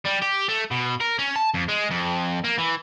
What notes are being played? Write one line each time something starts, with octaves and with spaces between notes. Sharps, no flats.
G3
G4
A3
B2
A#4
C#4
A5
F2
G#3
F2
A#3
E3